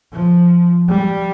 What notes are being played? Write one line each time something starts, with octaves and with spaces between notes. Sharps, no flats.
F3
G3